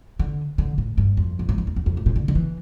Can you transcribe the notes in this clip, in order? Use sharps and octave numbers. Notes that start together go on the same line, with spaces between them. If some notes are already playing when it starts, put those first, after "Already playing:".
D3
D3
A2
G2
F2
A#2
A2
G2
F2
E2
F2
A2
A#2
D3
D3
E3